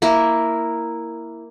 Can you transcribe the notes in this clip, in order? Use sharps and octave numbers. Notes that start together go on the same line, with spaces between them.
A#3 E4 A#4